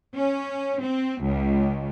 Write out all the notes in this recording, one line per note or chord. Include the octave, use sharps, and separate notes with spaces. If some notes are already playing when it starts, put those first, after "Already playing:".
C#4
C4
C#2